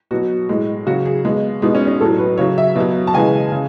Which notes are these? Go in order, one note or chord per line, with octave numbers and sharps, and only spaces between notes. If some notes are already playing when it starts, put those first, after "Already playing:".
B2 F#3 F#4
A2 G#3
C#3 F#3 F#4
G#4
B2 G#3
B2 G#3 D#4
C#4
C#4
A2 F#3 A4
B4
C#3 F#3 C#5
E5
B2 F#3
A5
C#3 E3 G#3 G#5
C#3